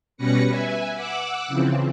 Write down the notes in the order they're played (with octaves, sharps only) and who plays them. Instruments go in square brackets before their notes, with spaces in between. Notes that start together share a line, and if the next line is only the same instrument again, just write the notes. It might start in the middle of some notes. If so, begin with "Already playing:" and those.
[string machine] B2 G3 C#4 B4 A#6 C#7
B4 E5 G#5
F#5 D6 E6 F#6
C#3 E3 F3 C4